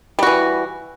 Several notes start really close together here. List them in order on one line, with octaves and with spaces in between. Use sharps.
G3 F#4 E3